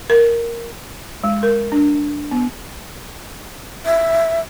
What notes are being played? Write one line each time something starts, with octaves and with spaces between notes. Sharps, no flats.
A#4
G#3
A#4
D4
B3
E5